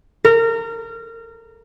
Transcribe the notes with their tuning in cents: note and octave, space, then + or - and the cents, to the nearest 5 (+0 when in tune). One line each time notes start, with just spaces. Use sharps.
A#4 -25